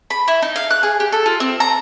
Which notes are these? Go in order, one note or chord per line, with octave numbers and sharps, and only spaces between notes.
B5
E4
D#4
F5
F#6
G#4
G4
A4
F4
C4
A#5